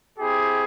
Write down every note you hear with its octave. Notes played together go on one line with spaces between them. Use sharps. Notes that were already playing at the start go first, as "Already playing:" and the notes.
C4 E4 G4 G#4